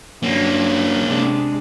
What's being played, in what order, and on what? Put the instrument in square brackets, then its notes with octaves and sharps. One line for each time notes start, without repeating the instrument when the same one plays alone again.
[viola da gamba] G2 F#3 [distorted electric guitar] A#3 C#4
[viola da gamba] C3 G#3 D4